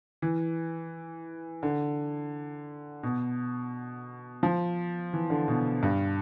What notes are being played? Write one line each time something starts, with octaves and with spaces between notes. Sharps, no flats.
E3
D3
B2
F3
E3
D3
B2
G2